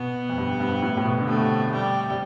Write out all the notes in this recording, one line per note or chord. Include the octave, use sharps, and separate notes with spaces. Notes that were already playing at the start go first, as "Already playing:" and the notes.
Already playing: B2 B3
F2
G2
G2
A2
A2
B2
D3
C3 A3
G3
C3